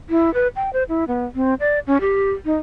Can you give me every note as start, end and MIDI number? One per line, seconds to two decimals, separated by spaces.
0.10 0.33 64
0.34 0.48 71
0.56 0.70 79
0.73 0.83 72
0.89 1.04 64
1.08 1.25 59
1.35 1.54 60
1.60 1.79 74
1.87 1.97 61
2.01 2.31 67
2.45 2.55 63